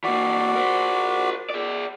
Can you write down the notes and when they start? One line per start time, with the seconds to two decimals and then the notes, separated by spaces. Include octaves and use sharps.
0.04 E3 A#3 F#4 D5
0.55 A#4 C5
1.50 G#4 D5